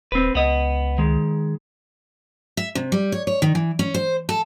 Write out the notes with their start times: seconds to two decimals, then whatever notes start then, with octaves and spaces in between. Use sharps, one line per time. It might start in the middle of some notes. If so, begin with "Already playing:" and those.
0.12 D#1 C4 B4
0.35 C#2 B3 D#5
0.98 D#3 G#3
2.57 E5
2.75 C3
2.92 G3
3.12 C#5
3.27 C#5
3.42 D#3
3.55 E3
3.79 C#4
3.94 C5
4.29 A4